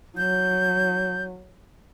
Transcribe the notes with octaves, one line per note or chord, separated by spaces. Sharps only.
F#3 G6